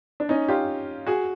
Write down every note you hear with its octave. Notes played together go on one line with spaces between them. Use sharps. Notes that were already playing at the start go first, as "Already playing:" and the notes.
D4
C#4 D#4
F4 G4
F#4 G#4